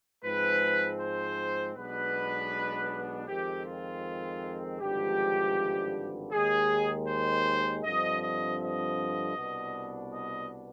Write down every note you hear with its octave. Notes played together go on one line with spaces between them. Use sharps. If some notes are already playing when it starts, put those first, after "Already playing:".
G#2 F3 G#3 C4 B4
C5
B1 B2 G#3 B3 D4 B4
F2 D#3 G#3 C4 G4
F4
G#1 G2 D3 F3 G#3 G4
D#2 D#3 G#3 G#4
C5
G2 D3 F3 C4 D#5
D#5
D#5
C2 B2 B3 D4
D#5